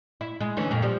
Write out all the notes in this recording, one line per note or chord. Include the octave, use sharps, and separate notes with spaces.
E4
G#3
D2 E3 C#4
F2 A#2 G#3
F3 G3